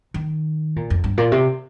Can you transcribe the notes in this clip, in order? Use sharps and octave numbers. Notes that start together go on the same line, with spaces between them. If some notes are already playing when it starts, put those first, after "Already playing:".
D#3
A#2
F2
G2
A#2
C3